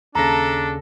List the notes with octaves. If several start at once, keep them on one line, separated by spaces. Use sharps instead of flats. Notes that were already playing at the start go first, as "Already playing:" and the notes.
D#2 C#3 D4 A4 A#5 A#6